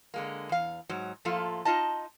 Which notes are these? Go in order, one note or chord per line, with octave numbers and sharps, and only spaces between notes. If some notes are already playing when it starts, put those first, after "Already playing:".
D3 G#3 A#3
E2 F5
G#2 F#3
A2 F3 A3 A#3 F4 A4
D#4 F4 D#5 A5